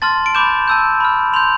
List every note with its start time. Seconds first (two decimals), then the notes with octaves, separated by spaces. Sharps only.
0.02 A5 C6 F6 A6
0.26 D7
0.35 B5 D6 G6 E7
0.68 A5 E6 G6
1.00 B5 F6
1.33 C6 F7
1.36 G6